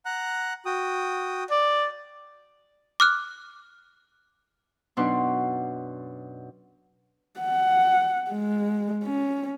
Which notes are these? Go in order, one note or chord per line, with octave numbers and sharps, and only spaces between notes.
F#5 A#5 F#6
F#4 G5 D#6
D5
D6 F6 F#6
F#2 B2 D4 D#4 F#5 C6
F#5
G#3
C#4